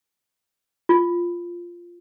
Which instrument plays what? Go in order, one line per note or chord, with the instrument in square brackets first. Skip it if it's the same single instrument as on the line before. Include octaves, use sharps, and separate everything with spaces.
[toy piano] F4